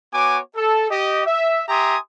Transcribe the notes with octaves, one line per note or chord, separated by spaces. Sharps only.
B3 F#4 C#5 G#5 D6
A4
G4 D#5
E5
G4 E5 G#5 A#5 C6 D#6